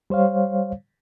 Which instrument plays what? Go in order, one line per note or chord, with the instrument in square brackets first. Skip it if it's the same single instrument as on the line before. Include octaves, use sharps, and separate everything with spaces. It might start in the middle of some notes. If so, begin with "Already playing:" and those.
[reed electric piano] G3 C5 C#5 F5